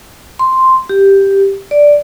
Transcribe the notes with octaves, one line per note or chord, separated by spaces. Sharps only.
C6
G4
D5